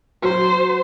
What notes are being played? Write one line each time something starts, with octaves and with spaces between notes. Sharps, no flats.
F#3 C5